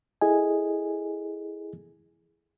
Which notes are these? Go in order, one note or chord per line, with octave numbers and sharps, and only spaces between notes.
E4 G#4 A4 D#5 G#5